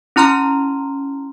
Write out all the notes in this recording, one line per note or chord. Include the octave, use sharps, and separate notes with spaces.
C#4 E4 A#5 C6 F6